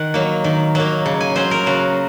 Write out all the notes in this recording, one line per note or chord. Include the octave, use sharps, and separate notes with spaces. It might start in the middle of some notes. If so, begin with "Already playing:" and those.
Already playing: D#3 F#5
F#3 A#3
D#3
F#3 A#3
C#3
G#5
F#3 C#4 C5
A#4
C#3 F#4